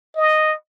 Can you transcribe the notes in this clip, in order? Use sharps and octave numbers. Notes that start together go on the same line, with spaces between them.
D#5